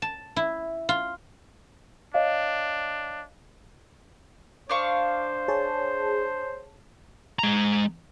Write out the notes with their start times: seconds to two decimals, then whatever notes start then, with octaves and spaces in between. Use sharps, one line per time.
0.02 A5
0.36 E4
0.89 F4
2.14 D4 C#5 D#5 F5
4.70 D4 C5 F5 C#6
5.48 G#4 C#5 A5
7.39 G#3 A#5